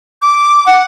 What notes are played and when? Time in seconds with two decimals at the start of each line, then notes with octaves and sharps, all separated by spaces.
0.22 D6
0.66 F#5